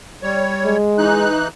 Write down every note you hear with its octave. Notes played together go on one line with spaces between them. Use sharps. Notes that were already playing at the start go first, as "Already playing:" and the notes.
G3 C#5
G#3
E3 D#4 F#6